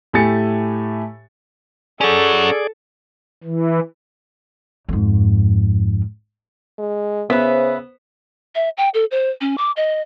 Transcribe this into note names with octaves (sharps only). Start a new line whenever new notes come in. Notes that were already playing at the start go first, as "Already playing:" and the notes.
A2 A3 G4 G#5 A6 C#7
C#4 F#4 G#4 A4 D5
E3
F2 G#2
G#3
C#3 B3 B4 C5 E5
E5
G5
A4
C5
C#4
D6
D#5